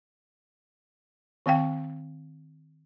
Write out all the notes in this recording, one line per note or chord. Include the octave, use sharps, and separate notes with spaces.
D#3 C4 F5 G5